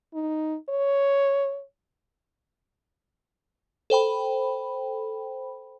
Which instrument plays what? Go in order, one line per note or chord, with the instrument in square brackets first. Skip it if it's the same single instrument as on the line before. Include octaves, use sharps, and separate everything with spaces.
[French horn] D#4
C#5
[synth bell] A4 C5 G5 B5